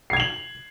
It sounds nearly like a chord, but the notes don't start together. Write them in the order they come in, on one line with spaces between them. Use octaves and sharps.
C7 G#6 F7 F#7